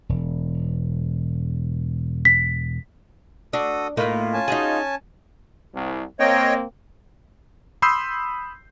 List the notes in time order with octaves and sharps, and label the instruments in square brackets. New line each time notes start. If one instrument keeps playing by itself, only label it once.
[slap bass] E1
[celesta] B6
[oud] D4 [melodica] F#4 A4 D#6
[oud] A2 A#3 D#4 [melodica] F4
[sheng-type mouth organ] C#4 G#5 A5
[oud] D#4 F#4 G#4
[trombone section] C2
[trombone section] A#3 C4 [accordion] C#5 D#5 G5
[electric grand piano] B5 C6 D#6 E6 G6 C7